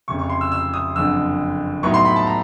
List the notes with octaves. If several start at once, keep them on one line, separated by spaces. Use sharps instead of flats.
F1 F2 C#3 C#6
C#6
C6
E6
E6
D#6
F#1 F2 D3 E6
A2 F#3 B3 D#4 C#6
C6
B5
A5
A#5